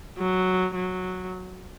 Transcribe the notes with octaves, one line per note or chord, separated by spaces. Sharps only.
F#3
F#3